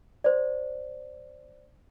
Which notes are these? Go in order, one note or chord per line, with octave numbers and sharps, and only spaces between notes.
C5 D5